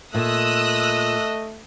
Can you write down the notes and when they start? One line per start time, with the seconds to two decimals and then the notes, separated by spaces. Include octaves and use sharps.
0.15 A#2 A3 D#5 D#6 E6 F#6